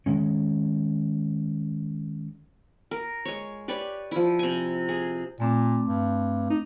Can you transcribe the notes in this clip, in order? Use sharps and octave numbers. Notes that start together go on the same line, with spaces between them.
D#3 G#3 C#4
A#4
G#3 C#5
G4 B4 C#5 D5
F3 E4
C3 G#5
G#4
A#2 A3 C4 D6
G2
D#4